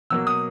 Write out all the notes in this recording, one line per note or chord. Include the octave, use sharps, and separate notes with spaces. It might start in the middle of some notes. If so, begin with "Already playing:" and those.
B2 F#3 A#3 E6
D#6